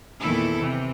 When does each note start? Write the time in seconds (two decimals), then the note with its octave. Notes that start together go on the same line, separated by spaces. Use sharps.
0.21 E2 A#2 D#3 E3 E4 A4
0.58 C3 E3